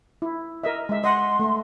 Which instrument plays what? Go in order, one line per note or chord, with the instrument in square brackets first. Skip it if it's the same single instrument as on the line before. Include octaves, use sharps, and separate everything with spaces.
[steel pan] E4
A#4 D#5 E5
G#3 E5
[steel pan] D#5 F#5 [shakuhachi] C6
[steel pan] A3